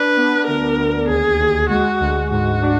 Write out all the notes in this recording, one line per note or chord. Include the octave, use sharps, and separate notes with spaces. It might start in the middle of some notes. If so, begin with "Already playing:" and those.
Already playing: D4 B4
B3
D2 A#4
D2
D#2 G#4
D#2
G#3 F#4
D2
G#2 F#4
D4